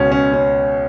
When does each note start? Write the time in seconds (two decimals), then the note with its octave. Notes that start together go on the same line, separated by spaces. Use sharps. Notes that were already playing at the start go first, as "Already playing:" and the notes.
Already playing: C#2 B2 C#4
0.12 C#4
0.33 C#4